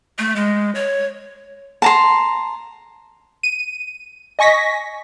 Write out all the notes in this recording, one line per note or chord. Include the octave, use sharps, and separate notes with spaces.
A3
G#3
C#5
A5 A#5 C6
D#7
D#5 G#5 C#6 A#6 B6